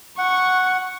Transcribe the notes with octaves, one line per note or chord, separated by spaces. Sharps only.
F#5 C#6